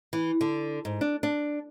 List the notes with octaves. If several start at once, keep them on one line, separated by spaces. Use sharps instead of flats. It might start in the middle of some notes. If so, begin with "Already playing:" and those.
E3
D3
G#2
D4
D4